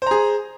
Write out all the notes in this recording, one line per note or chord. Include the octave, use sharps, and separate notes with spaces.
G#4 C5 A#5